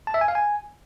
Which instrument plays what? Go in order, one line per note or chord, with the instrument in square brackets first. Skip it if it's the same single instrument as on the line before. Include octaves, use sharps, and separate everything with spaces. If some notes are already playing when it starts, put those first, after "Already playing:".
[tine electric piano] A5
E5
G#5
F5
G#5